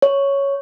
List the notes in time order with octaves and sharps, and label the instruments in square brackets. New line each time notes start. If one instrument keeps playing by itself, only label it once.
[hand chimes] C#5